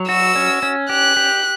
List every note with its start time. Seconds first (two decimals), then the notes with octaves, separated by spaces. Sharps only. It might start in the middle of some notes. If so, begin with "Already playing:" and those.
Already playing: F#3
0.08 F#4 E6
0.36 C#4
0.63 C#4
0.90 G4 F#6
1.17 G4